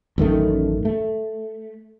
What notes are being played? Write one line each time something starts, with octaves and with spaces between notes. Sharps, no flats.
A1 F#2 D#3 A3
A3